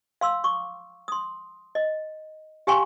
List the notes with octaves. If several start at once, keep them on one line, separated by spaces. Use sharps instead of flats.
F5 C6 E6
C#6 D6
C6 D#6
D#5
G4 F5 G5 G#5 C6 C#6